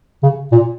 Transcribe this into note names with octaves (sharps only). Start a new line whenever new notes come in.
C#3
A#2